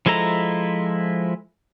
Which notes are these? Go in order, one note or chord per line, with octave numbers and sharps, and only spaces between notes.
F3 G#3 E4 A4 A#5